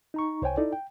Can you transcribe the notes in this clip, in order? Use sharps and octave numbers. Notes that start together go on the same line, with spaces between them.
D#4 A#5 C#6
C2 C5 C#5 G5 G#5
D#4 E4 A4 D5
G5